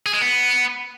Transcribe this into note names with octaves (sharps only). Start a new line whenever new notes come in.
G#4
G#3
B3